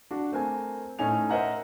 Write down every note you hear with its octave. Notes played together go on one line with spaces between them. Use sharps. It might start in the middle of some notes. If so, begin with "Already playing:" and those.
D4 F#4
A3 C4 A#4 G#5
A2 C#4 D#4 G#5 F7
A#4 C5 D#5 E5 F#5 A#5